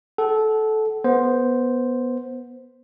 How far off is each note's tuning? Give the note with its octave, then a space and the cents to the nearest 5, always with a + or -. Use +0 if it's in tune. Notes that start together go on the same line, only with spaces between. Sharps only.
A4 -20 F#5 +30
B3 -15 C5 +0